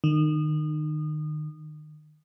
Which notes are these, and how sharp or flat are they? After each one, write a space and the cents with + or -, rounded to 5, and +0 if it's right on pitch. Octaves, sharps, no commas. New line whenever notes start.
D#3 -30